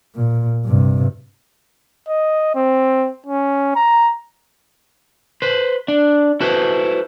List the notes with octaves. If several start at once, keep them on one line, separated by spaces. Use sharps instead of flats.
A#2
G2 C3
D#5
C4
C#4
A#5
B4 C5
D4
E4 F#4 A4 B4 C5